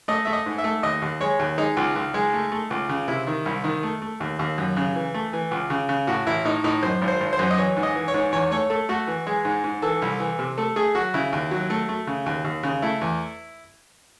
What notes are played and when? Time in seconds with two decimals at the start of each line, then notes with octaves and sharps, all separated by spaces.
0.08 A3 D#5
0.25 A3 E5
0.33 D#5
0.46 G#2
0.58 E5
0.64 A3
0.83 D#2 D#5
1.02 D#2
1.21 G#3 C#5
1.39 D#2
1.58 G#3 D#4
1.77 C#2
1.96 C#2
2.14 G#3
2.33 A3
2.52 A3
2.70 C#2
2.89 C#3
3.08 C3 E4
3.27 D#3
3.46 C2
3.64 D#3
3.83 A3
4.02 A3
4.20 D#2
4.39 D#2
4.58 F#2
4.77 C#3
4.96 E3
5.14 A3
5.33 E3
5.51 C#2
5.70 C#3
5.89 C#3
6.07 A2 F#4
6.27 A1 E4
6.45 A2 D#4
6.64 A2 D#4
6.83 F#2 C5
7.02 G#1
7.08 C5
7.20 G#1
7.33 C5
7.39 F#2
7.51 D#5
7.58 E3 C#5
7.77 G#2
7.83 D#5
7.95 E3
8.08 C#5
8.14 G#2
8.32 E2 C#5
8.51 A3 C#5
8.70 A3 A4
8.89 A3 F#4
9.07 E3
9.27 G#3
9.45 G#2
9.64 G#2
9.82 E3 A4
10.02 C2
10.20 E3
10.39 C3
10.58 A3 A4
10.76 A3 G#4
10.95 F#3 F#4
11.14 C#3 E4
11.33 D#2
11.51 F#3
11.70 A3
11.89 A3
12.07 C#3
12.26 D#2
12.45 D#2
12.63 C#3
12.82 A3 E4
13.01 E2